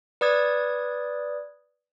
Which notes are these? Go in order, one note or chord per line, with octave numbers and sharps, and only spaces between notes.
B4 D5 D#6 G#6